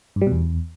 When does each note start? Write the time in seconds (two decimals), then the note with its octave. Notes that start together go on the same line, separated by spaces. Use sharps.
0.16 G2
0.21 G3
0.27 B2
0.32 E2